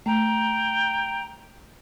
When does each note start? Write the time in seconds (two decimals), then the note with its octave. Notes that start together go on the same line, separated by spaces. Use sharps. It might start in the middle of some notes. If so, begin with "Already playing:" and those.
0.06 A3 G5 A#5